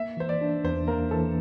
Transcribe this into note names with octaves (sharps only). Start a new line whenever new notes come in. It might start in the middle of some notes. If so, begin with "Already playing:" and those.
Already playing: A#3 E5
E3 C5
D5
D4
E2 C5
A#3 A#4
E3 A4